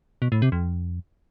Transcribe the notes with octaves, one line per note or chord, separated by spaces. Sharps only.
B2
A2
C3
F2